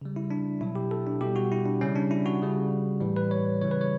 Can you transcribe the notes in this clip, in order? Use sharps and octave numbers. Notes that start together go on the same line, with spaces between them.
C#3 G3
E4
D4
B2 F#3 E4
G4
A4
D4
B2 G3 G4
F#4
E4
D4
C#3 G3 C#4
D4
E4
F#4
C#3 G3
A2 E3 G3
B4
C#5
C#3 E3 G3 C#5
B4
C#5